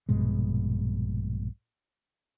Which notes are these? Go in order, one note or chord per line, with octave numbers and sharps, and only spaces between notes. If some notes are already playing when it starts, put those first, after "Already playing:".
A#1 G2 B2 G#3